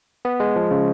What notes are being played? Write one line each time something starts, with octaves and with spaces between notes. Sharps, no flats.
B3
G#3
F3
C#3